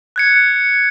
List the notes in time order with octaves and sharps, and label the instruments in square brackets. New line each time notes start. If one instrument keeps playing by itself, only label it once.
[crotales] F#6 G#6 C#7